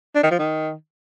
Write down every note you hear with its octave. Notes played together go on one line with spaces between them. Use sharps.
D4
D#3
F3
D#3